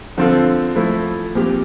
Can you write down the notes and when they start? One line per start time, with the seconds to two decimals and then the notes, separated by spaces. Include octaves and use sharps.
0.18 D3 F3 C4 F4 A4
0.76 F3 A3 E4
1.35 A#2 F3 C4 G4